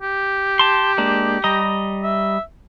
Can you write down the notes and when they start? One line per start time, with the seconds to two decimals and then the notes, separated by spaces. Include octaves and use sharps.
0.02 G4
0.59 A5 C6
0.98 G#3 A#3 D4
1.44 G3 D#5 A#5
2.03 E5